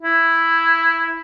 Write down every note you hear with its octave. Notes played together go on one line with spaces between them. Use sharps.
E4